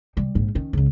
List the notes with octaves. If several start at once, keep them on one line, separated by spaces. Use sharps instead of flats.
C3 G3
A#1 G#2
D#3 C#4
C#2 C#3